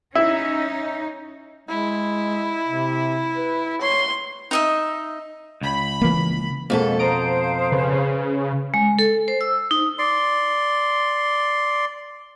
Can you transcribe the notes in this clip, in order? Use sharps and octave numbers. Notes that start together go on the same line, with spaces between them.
C#4 D#4 E4
G#3 E4
C3
B4
C#5 C6
D#4 D#5 E5
C#2 B5
E3 A#3
F2 B2 F3 G#3 A#3 A4
C5 F5 A#5 D#6 D7
C#3 B4
G#3
A4
C5
E6
D#4
D5 C6